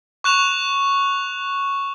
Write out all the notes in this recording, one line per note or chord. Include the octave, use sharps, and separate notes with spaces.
C#6 F#6 E7 F7